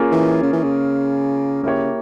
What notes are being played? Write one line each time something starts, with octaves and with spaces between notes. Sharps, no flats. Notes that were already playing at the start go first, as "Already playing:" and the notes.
Already playing: A#3 C#4 F4 G#4 C#5
E3
C#3
E3
C#3
C#3 A#3 E4 G4 C#5